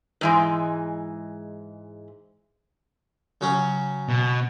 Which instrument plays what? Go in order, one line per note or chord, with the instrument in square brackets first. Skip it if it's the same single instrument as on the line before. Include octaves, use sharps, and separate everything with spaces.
[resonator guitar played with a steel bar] G#2 E3 G#3
[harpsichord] C#3 F#3 C#4
[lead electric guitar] B2